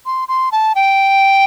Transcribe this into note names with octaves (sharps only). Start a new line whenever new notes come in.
C6
C6
A5
G5